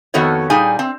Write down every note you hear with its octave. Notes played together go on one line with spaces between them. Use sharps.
F2 D#3 B3 F#4 A4 C#5
A#2 G3 D#4 G#4 G#5
C4